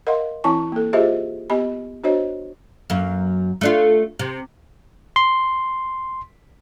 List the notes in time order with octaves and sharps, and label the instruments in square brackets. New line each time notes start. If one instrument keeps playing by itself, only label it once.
[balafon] A#4 D#5 F5 F#5 C6
E3 C4 E4 G#5 A5 C#6
A#3 A4
F4 G4 G#4 C5 D#5 E5
B3 G4 D#5 G#5 B5
D4 F#4 C5 C#5 D#5
[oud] F#2 A#3
A3 D4 F4
C3
[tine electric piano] C6